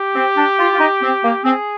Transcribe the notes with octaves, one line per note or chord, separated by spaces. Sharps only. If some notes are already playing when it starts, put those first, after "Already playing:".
Already playing: G4
C4
D4
F4
F4
D#4
C4
A#3
C4 G#4